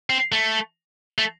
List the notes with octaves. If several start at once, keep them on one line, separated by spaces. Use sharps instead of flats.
C4
A3
A3